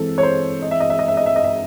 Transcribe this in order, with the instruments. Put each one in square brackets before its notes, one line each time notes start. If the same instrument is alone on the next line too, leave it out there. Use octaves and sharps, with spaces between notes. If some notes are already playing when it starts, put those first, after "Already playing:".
Already playing: [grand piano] E3 G#3 C4 [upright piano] A4
[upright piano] C#5
C5
D#5
E5
D#5
E5
D#5
E5
D#5
E5
D#5
E5